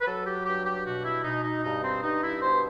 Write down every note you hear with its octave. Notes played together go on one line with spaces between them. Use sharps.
B4
F#3 A4
G4
G2 G4
G4
B2 F#4
E4
B2 D#4
D#4
G2 D#4
C4
G2 D#4
E4
B2 C5